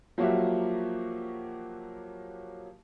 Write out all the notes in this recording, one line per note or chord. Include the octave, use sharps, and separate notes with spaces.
F3 F#3 A#3 F#4 G4 E5